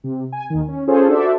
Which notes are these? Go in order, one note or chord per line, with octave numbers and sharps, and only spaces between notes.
C3
G#5
D#2 D#3
C#4
C#4 F4 G#4 A4 C5 C#5
D4 F#4 A4 C5 D5 E5